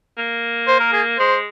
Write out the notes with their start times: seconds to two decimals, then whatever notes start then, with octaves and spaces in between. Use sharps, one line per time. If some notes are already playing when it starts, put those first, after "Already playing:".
0.18 A#3
0.68 C5
0.80 A#4
0.93 G#4
1.19 G#3 C5